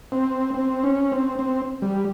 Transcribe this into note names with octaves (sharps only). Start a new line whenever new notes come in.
C4
C4
C#4
C4
C4
G3